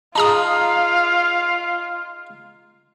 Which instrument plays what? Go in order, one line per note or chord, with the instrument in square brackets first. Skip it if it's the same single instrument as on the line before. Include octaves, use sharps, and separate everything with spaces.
[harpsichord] D#4 G#4 [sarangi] F4 [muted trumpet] F5 [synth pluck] A5 A#5 D#6